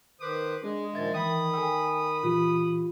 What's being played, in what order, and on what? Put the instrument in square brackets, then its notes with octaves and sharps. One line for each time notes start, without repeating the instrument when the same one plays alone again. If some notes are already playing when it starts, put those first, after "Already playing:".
[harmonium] D#3 C5 [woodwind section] B4 D6 D#6
[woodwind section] G#3 [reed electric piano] D4 [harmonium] G#4
[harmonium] A#2 D#3 F3 [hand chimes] E5 G#6 A6
[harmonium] D#3 [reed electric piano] E3 [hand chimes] G5 [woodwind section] B5 D#6
[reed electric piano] A4 E6 [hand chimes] G5 G#5
[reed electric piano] A#2 E3 G4 [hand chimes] F4